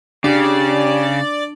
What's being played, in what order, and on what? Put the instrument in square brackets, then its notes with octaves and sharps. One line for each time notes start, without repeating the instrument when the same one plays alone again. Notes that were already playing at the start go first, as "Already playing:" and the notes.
[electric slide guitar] C#3 [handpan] D4 [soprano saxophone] G4 [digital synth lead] D5